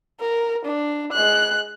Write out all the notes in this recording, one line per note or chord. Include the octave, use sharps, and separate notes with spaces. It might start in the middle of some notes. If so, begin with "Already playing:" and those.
A#4
D4
G#3 F#6